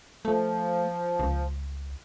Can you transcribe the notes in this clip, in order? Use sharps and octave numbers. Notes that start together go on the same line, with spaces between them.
F3 A3
C#2